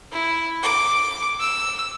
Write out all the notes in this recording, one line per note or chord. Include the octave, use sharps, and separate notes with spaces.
E4
D6
E6